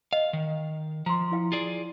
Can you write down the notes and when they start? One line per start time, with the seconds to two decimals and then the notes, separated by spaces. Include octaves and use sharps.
0.13 D#5 F5
0.33 D#3
1.06 F3 A#5 C6
1.32 E4 F5 G5
1.52 F4 G#4 D5